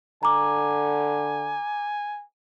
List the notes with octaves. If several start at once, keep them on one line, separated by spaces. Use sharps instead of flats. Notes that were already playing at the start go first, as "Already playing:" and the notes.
D3 G#5 A#5 D6